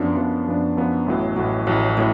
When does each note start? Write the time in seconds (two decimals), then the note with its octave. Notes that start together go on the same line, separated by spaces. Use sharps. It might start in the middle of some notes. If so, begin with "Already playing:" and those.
Already playing: F#2 F3 B3 D4
0.17 F#2 F3 B3 D4
0.47 F#2 F3 B3 D4
0.77 F#2 F3 B3 D4
1.06 A1 A2 F#3
1.36 A1 A2 F#3
1.67 A1 A2 F#3
1.97 A2 F#3